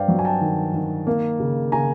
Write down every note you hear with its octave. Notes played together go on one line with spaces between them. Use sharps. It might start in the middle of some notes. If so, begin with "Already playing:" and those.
Already playing: G2 C5 D5 F5 G5
F#3
G#5
G5 A5
D#3
D#3
A#3
C#3
C#3 G#5 A#5